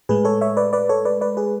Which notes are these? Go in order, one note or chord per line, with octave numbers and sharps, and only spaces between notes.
A2 G#3 G#4 B4
A4 C#5
C#5 E5
B4 D5
B4 D5
A4 C#5
B4 D5
B4 D5
G#4 B4